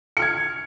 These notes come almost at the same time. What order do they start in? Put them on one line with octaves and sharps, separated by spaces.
C#7 F6 G#6